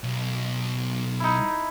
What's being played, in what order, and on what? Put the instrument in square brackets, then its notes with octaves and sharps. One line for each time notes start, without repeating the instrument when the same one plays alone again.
[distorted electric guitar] B1
[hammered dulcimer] D#4 E4